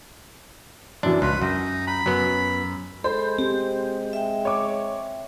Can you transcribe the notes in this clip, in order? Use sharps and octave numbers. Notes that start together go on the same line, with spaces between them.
F#2 E3 F#3 D4
C#2 B4 C6
F#2 D#4
A#5 B5
F#2 F#3 B3
G#3 A4 C5 B5
C4 G4
E5 G5
C#5 D6